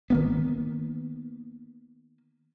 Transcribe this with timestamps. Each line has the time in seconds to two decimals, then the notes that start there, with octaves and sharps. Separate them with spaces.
0.10 D#3 A#3 B3